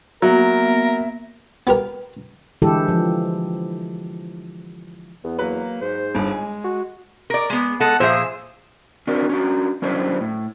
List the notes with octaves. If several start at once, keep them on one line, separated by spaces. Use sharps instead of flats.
F#3 A#3 B3 A#4 E5
B3 G4 A#4
D3 E3 G#3 E4 G4 A4
F3
E2 B3
F#3 A#3 B4
G#2 C5
G1 G2 G#4
G#3 G#5
F#4
A#4 D5
G#3 B3
G#3 A4 F#5 A5
A#2 F3 G#4 C5 E5 E6
C4 D4 F#4 A#4 D5
C#4 D4 F#4
F#3 C#4 D4 E4 C5 D5
A2